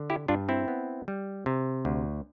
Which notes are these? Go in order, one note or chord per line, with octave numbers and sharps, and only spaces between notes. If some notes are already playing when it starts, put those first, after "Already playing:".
Already playing: D3
E4 G4
G2 D4 F4
C4 E4
B3
G3
C3
D2